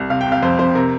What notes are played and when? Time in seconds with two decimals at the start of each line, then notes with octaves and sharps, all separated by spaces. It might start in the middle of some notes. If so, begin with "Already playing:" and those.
Already playing: C2
0.10 C3 F5
0.21 G5
0.27 C3
0.32 F5
0.42 F2 C5
0.59 F2 C5
0.75 C3 A#4